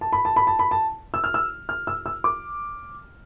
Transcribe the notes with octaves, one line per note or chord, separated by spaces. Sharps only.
A5
B5
A5
B5
A5
B5
A5
E6
F6
E6
F6
E6
E6
D6